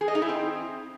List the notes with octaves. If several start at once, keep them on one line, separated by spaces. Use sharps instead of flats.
G#4
D#5
D#4
E4
C4